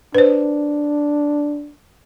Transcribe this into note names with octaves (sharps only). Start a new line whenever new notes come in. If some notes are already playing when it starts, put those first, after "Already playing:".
D4 B4 C5